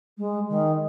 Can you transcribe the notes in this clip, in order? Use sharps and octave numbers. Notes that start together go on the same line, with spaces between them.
G#3
D#3